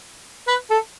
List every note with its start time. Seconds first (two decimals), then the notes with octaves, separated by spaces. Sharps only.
0.47 B4
0.71 A4